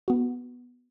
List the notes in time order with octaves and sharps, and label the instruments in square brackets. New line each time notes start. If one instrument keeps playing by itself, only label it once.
[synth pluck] B3 F#4